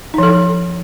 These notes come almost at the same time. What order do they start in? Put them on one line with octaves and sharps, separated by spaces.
D#4 F3 A4